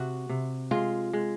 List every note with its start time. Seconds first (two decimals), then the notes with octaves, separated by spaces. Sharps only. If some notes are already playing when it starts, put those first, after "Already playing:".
Already playing: C3 F#4
0.29 C3
0.71 G#3 F4
1.13 G#3